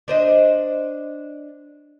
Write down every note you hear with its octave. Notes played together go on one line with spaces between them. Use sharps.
D4 C5 D#5